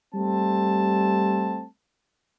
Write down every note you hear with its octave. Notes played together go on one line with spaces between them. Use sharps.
G3 A3 C4 A5